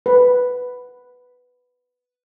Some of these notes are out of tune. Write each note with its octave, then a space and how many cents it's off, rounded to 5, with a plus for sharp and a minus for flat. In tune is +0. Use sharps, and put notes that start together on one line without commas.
B4 +5